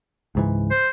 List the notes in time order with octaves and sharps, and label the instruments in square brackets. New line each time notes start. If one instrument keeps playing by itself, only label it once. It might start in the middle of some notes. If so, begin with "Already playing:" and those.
[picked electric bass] C#2 G#2 E3
[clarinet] C5